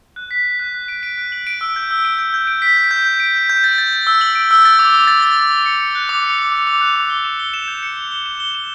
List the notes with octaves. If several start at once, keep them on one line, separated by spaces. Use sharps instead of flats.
F#6
B6
B6
F#6
F#6
D7
D7
F#6
F#7
D7
E6
G6
E6
D7
G6
G6
D7
B6
G6
G6
G6
D7
G6
G6
A6
A6
A6
E6
F#7
D7
E6
A6
D6
D6
A6
A6
D6
D6
C#7
C#7
F#6
D6
C#7
D6
D6
D6
F#6
D6
G7
E7
G7
E7
G6
C#7
G7
G7
E7
G7
E7